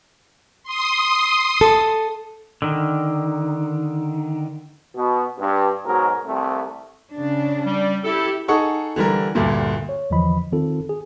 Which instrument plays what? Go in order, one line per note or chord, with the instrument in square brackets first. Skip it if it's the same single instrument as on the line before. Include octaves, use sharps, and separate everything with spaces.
[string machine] C6 D#6
[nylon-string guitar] A4
[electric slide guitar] D3 D#3
[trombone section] B2
G2
G#2 B2 F#3 A#4
C2 A3 C4
[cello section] C#3 D4
[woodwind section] G3
[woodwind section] E4 A4 [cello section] G4
[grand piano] D#4 G#4 A4 F#5 C#6
D3 E3 G3 A#4
D2 G2 A#2 D3
[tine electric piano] C#5
E2 D3 E3 F3 D#5 B5
D#3 C4 F4 A4
G#4